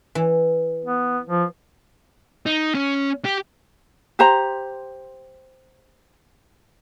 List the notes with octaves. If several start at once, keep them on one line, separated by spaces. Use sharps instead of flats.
E3
B3
F3
D#4
C#4
G4
G4 C5 A#5